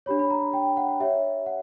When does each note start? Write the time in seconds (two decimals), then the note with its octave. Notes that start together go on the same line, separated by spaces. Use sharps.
0.06 D4 G4 C#5 B5
0.19 B5
0.31 A#5
0.53 G5
0.77 F#5
1.00 G4 C#5 E5
1.46 F#5